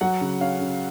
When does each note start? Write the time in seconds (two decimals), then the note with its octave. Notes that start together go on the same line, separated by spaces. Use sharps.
0.01 F#3 F#5
0.21 C#3
0.41 C#4 F5
0.61 C#3